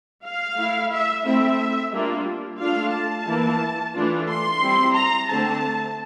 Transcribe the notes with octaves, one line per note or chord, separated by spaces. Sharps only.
F5
A3 E4
E5
A3 C4 E4 E5
G3 A#3 D4 F4
A3 D4 F4 F5
A5
E3 A#3 E4
E3 A3 D4 F4
C6
G3 C4 E4
A#5
D3 A3 C4 A5